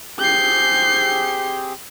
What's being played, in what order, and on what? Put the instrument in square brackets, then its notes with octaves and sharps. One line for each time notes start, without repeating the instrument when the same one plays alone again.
[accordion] C4 G4 G#4 [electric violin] G6 C7